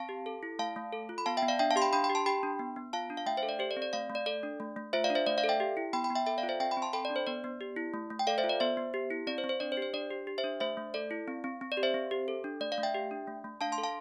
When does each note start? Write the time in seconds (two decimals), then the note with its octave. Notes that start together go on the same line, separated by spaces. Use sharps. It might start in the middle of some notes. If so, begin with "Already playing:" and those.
Already playing: C4 F5 A5
0.09 G4
0.26 A4
0.43 E4
0.59 A3 F5 A5
0.76 A3
0.93 A4
1.09 F4
1.18 B5
1.26 B3 F5 A5
1.37 E5 G5
1.42 B3
1.48 D5 F5
1.59 D4 E5 G5
1.71 F5 A5
1.76 G4 C6
1.82 G5 B5
1.93 D4 G5 B5
2.04 G5 B5
2.10 G4
2.15 A5 C6
2.26 G4 G5 B5
2.43 D4
2.59 B3
2.76 B3
2.93 F4 F5 A5
3.10 D4
3.17 F5
3.26 A3 E5 G5
3.37 C5 E5
3.43 A4
3.49 D5
3.59 G4 C5
3.71 D5
3.77 C4
3.82 D5
3.93 A3 D5 F5
4.10 A3
4.15 D5
4.26 A4 D5
4.43 D4
4.60 A3
4.76 A3
4.93 F4 C5 E5
5.04 D5 F5
5.10 D4
5.15 C5 E5
5.26 A3 D5
5.38 D5 F5
5.44 A4
5.49 E5 G5
5.60 G4
5.77 E4
5.93 B3 G5 B5
6.04 G5 B5
6.10 B3
6.15 E5 G5
6.26 A4 E5 G5
6.38 D5 F5
6.43 F4
6.49 C5 E5
6.60 C4 E5 G5
6.71 G5 B5
6.77 C4
6.82 A5 C6
6.93 A4 G5 B5
7.05 D5
7.10 D4
7.16 C5
7.27 B3 D5
7.44 B3
7.61 G4
7.76 E4
7.94 A3
8.10 A3
8.19 G5
8.27 A4 D5 F5
8.38 C5 E5
8.44 F4
8.49 D5
8.60 B3 C5 E5
8.77 B3
8.94 G4
9.11 E4
9.27 C4 D5
9.38 C5
9.44 C4
9.49 C5
9.60 D4 D5
9.72 C5
9.77 G4
9.82 C5
9.94 D4 D5
10.11 G4
10.27 G4
10.38 C5 E5
10.44 D4
10.60 A3 C5 E5
10.77 A3
10.94 A4 D5
11.11 E4
11.28 C4
11.44 C4
11.61 C4
11.72 D5
11.77 G4
11.83 C5 E5
11.94 C4
12.11 G4
12.28 A4
12.44 D4
12.60 A3 D5
12.72 D5 F5
12.78 A3
12.83 E5 G5
12.94 G4
13.11 D4
13.27 A3
13.44 A3
13.61 D4 F5 A5
13.72 A5 C6
13.78 A4
13.84 F5 A5